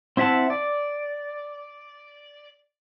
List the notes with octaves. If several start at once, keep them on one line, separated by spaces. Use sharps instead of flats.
C4 E4 E5 F#5 A5
D5